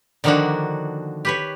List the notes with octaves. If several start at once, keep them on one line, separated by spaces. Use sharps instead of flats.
D3 D#3 F3 A#3 D4 F#4
G4 B4 C#5